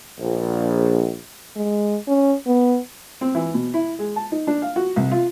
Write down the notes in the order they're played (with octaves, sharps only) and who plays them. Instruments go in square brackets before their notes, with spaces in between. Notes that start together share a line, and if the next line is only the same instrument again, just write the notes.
[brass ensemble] A#1
[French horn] G#3
C#4
B3
[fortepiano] C4
E3
B2
E4
G#3
A5
D#4
D4
F5
F#4
C2
F4